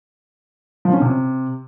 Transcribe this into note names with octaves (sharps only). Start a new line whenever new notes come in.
F3
C#4
C3